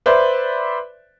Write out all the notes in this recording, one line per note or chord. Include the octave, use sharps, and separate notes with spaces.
B4 C5 D5 E5